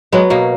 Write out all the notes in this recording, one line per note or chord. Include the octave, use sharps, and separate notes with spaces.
F#3 G#3 B3
B2 A#3